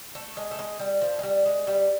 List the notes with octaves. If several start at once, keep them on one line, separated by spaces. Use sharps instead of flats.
A3
G#3
A3
G#3
G3
F3
G#3
G3
G#3
G3